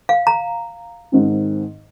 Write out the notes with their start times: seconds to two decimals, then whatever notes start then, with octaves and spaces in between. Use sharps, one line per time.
0.09 F5
0.27 A#5
1.12 G#2 D#3 C4 D#4